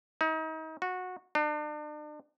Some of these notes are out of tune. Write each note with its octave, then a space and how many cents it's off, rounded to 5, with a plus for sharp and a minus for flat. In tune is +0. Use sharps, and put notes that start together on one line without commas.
D#4 +35
F#4 -15
D4 +40